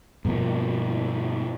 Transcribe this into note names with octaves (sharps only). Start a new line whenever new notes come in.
G2 B2 F3 A#3